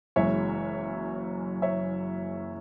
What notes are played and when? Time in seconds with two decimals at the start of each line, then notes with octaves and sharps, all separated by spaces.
0.16 F#1 F#2 E3 G#3 C#5 E5
1.62 C#5 E5